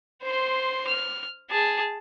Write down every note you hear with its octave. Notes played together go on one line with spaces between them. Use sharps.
C5 C6
F6
G#4 A5